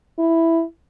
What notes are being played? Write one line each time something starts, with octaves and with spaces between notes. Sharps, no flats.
E4